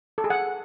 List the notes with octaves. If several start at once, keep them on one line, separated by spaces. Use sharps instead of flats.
A4
G#4
F#5